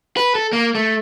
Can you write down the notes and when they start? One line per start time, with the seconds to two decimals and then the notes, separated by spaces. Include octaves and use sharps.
0.17 B4
0.35 A4
0.53 A#3
0.75 A3